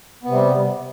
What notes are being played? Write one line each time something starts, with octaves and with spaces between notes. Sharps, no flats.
C3 G3 B3